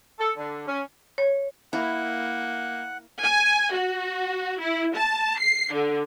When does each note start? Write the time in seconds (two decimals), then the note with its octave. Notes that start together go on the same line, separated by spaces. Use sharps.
0.18 A4
0.37 D3
0.67 C#4
1.18 C#5
1.73 A#3 E4 F#5
3.22 G#5
3.73 F#4
4.60 E4
4.95 A5
5.39 C7
5.72 D3